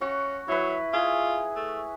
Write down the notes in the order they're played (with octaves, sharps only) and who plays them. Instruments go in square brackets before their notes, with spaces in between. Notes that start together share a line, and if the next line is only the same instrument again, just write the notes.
[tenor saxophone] C#4 [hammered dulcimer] F#4
[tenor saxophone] F#3 [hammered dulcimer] E4 B4
[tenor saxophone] F4 [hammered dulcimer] G#4
[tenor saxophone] A3